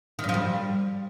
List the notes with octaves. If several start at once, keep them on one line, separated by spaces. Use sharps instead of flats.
D#3
G2
F3
G3